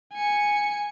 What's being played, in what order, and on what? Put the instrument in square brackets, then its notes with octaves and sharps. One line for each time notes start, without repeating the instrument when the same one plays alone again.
[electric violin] G#5 C#7